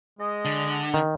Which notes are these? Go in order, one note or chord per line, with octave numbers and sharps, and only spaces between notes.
G#3 D#5
D3
D#3